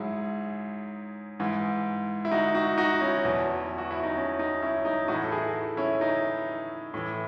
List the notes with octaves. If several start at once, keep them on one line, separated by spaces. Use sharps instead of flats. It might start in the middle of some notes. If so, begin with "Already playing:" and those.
Already playing: G#2 F#3 E4 G#4
G#2 E3
E4
D#4 F#4
D#4 F#4
D#4 F#4
C#4 E4
E2 B2 F#3
F#4
E4
D#4
C#4
D#4
C#4 E4
D#4
A2 E3 D#4 F#4
A4
E4 G#4
C#4 E4
D#4
A2 E3